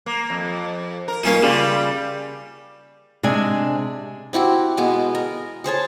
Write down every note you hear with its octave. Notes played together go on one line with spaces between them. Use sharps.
A#3
F2
A#4
B2 A#3 C#4 D#4 F4
C#3 G3 F4 G4
C3 G#3 D4 G#5
C4 E4 F#4 G4
B2 G#3 B3
A#4
G#4 C5 C#5 A5